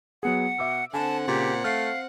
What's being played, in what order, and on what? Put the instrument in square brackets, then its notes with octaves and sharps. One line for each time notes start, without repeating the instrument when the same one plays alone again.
[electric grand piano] F#3 B3 G#4 [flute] F#5
[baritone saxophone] B2 [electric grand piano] E5 D6 E6
[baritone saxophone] D3 [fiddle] C4 F#5 [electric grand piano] G#5 [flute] A5
[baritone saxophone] A#2 [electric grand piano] C#3 [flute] G4
[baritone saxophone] A3 [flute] F5 [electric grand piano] F6